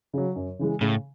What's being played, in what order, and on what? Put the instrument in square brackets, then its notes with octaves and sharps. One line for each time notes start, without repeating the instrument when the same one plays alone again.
[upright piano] C#3 F#3
F#2
C#3 E3 G#3
[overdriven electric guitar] A2 [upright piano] C#3